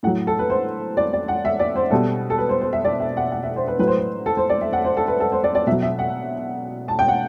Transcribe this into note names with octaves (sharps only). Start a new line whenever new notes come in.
A2 F#3 F#5
A4
B4
C5
D5
D5
F#5
E5
D5
C5
B2 G3 A4
A4
B4
C5
C5
E5
D5
E5
F#5
F#5
E5
C5
B4
A2 F#3 B4
C5
B4
A4
C5
D5
E5
F#5
C5
A4
B4
A4
C5
D5
D5
B2 F#3 E5
E5
F#5
A5
G5
F#5